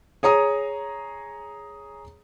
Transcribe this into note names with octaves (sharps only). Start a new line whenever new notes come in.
G#4 C#5 A#5 D#6